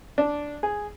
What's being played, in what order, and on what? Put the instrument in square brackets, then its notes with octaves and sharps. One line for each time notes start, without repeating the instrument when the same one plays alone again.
[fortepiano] D4
G#4